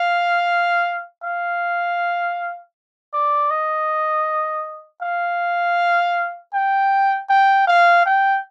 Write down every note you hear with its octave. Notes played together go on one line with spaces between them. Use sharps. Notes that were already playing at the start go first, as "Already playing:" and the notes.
Already playing: F5
F5
D5
D#5
F5
G5
G5
F5
G5